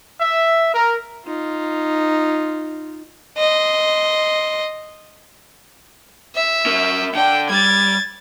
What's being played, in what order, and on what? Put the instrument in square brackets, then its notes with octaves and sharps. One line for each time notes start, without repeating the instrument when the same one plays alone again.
[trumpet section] E5
A#4
[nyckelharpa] D#4 F4
[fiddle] D#5 C6
[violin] E5
[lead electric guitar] C#4 A#4
[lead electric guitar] D3 D5 [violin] G5
[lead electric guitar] G3 [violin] G#6 A6